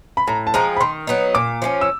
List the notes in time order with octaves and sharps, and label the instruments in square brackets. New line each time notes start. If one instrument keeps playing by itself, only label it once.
[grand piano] B5
[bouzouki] A2 [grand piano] A#5
[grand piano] A5
[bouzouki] F3 G#3 C4 [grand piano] A#5
[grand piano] B5
[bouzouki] D#3 [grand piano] C6
[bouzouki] F#3 B3 D#4
[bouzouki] A#2 [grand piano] D6
[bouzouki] F3 A3 C#4
[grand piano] E6